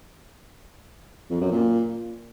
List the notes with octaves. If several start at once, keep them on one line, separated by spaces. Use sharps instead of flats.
F2
F#2
A#2